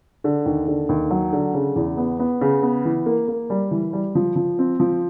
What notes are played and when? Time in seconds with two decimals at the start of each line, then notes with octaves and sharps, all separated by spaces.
0.24 D3
0.46 D#2
0.68 D3
0.89 D#2
1.11 F#3
1.33 D3
1.54 C#3
1.76 E2
1.97 B3
2.19 B3
2.41 C#3
2.63 B3
2.85 E3
3.06 A#3
3.28 A#3
3.50 G3
3.71 E3
3.93 G3
4.15 F3
4.36 F3
4.59 C4
4.80 F3